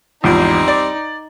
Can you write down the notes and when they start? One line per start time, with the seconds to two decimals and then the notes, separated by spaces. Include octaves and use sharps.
0.24 G#1 E2 F3 G3 C4 D#4
0.68 D5